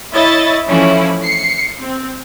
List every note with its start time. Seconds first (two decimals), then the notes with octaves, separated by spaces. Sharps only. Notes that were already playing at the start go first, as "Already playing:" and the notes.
0.14 E4 C#5 D#5 E5 A6
0.68 E3 F3 A3 C#4 E4
1.23 C7 C#7
1.81 C4